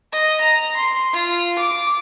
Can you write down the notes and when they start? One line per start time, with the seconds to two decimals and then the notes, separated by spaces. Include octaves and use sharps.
0.13 D#5
0.41 A#5
0.77 C6
1.13 F4
1.59 D6